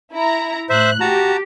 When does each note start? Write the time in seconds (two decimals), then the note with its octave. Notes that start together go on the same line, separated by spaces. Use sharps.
0.13 E4 A#5
0.69 A2 C5 E5 F#6
1.00 F#4 G4 A5 A#5